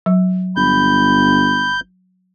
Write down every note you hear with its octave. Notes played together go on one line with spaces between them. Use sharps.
F#3
G1 B5 G6